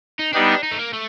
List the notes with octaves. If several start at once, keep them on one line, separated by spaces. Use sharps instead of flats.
D#4
G3 B3 D4 D#4 G4
D#4
A3
A#3
A3